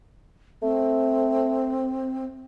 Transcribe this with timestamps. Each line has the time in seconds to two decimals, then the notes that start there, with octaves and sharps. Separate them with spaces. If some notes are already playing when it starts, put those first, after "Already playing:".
0.62 A3 C4